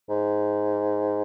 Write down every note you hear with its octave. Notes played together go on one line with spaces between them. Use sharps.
G#2